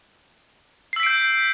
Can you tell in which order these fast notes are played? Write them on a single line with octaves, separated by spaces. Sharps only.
C7 E6 B6 D7 G6